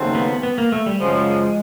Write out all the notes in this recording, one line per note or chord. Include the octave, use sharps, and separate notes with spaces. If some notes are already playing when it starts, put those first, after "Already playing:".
Already playing: D#2 C#3 F#3 A3 C4
B3
B3
A#3
A3
G3
F#2 C#3 F3 G#3